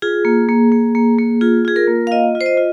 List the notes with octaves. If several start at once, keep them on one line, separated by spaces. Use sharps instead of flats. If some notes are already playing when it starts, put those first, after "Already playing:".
F4 G#4
A#3
A#3
A#3
A#3
A#3
F4 G#4
F4 G#4
A#4
A#3
F5
F4 D#5
F4
C5
D#5
F4